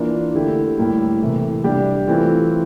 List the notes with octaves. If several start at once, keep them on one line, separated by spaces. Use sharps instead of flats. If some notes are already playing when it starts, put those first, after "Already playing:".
Already playing: E3 A#3 D4 F4
D3 A3 E4 G4
A2 G3 A#3 E4
C3 E3 A3
G3 D4 G4
E3 A3 C4 F4